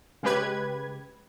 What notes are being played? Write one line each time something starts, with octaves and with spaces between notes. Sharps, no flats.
C#3 G#3 G4 B4 G#6